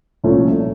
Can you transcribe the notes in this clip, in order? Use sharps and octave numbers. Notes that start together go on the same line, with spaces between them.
C2 A#2 F3 A3 C#4